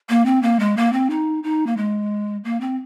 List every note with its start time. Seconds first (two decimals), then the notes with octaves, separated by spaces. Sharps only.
0.10 A#3
0.26 C4
0.43 A#3
0.60 G#3
0.77 A#3
0.93 C4
1.10 D#4
1.44 D#4
1.67 A#3
1.77 G#3
2.44 A#3
2.61 C4